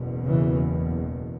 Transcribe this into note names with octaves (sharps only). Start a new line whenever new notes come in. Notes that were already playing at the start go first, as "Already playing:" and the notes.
Already playing: F#1 E2 B2
C#3 E3